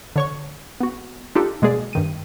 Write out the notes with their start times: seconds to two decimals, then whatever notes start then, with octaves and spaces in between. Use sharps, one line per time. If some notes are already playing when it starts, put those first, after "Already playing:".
0.16 D3 C#5 C#6
0.80 B3 F#4
1.35 D4 D#4 F4 G4 A4
1.62 B2 G#3 A#3 G#4 D5
1.93 G2 D#3 D#7